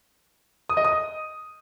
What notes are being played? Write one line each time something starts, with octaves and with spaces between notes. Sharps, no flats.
D#6
D#5
D#6